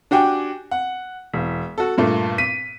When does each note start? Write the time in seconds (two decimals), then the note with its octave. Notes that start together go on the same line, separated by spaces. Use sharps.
0.11 D4 F#4 G4 G5 G#5
0.71 F#5
1.33 E1
1.78 F#4 A4
1.98 G2 A#2 A3
2.38 B6 D#7